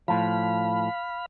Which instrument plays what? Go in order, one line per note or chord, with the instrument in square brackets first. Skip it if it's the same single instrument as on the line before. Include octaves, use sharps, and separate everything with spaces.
[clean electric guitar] A2 F3 [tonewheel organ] F5 B5